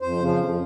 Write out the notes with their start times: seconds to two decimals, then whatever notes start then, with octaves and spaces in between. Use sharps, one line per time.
0.01 F2 C5
0.20 C#3 F3
0.38 F2